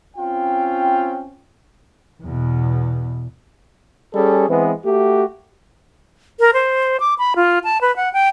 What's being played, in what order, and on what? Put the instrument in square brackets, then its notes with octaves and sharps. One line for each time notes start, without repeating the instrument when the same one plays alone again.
[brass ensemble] C4 C#4 F4 G5
[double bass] E2 B2
[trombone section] G3 C#4 G#4 A4
E3 G#3 B3 C4
A3 F#4 G4
[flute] A#4
C5
D6
B5
F4
A5
B4
F#5
G5